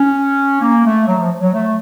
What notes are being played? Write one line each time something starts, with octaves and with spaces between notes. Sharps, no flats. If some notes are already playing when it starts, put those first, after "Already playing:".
Already playing: C#4
A#3
A3
F#3
F3
F#3
A3